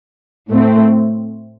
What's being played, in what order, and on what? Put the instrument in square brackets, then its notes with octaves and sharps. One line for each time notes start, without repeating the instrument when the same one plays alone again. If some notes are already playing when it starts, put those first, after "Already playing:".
[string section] A2 A3 C4